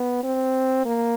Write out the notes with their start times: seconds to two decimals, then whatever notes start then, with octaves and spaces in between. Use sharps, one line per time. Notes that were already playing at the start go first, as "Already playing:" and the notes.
Already playing: B3
0.24 C4
0.86 A#3